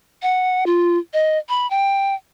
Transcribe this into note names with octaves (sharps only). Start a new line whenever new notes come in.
F#5
F4
D#5
B5
G5